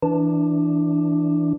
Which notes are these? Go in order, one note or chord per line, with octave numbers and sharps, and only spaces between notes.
E3 D4